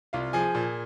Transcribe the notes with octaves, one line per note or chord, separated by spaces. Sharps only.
C2 F4 F5
F3 G#4 G#5
A#2